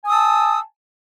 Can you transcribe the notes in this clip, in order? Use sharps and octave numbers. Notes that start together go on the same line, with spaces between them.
G#5 A5 D#6 E6